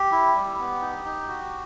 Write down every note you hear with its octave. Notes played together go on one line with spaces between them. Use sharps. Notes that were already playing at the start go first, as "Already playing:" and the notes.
Already playing: G4
E4
G3
B3
D#4
D#4
F#4